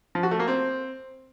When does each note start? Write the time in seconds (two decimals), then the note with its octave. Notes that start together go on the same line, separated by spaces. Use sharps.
0.15 F3
0.23 F#4
0.31 A3
0.39 A#3
0.48 C4